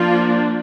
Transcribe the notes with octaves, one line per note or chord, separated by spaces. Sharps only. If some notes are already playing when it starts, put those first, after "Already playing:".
Already playing: F3 A#3 D4 F4